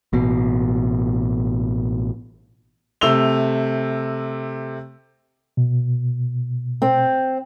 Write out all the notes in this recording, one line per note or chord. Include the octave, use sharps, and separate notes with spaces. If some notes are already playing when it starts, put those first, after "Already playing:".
A1 B2
C3 A3 E6 F7 G7
B2
C4